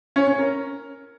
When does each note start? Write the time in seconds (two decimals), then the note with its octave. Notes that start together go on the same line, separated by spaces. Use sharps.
0.16 C#4
0.27 C#4
0.38 A#4